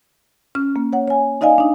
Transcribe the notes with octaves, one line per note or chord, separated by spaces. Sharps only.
C#4 F6
A#3
C#5 F#5
C#5 G#5
D#4 D5 D#5 F5 G#5
D4 D#4